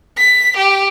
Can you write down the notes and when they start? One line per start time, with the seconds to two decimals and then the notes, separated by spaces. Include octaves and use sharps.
0.18 B6
0.57 G4